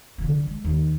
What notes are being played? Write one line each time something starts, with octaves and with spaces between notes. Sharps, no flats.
D3 F3
G#3
D#2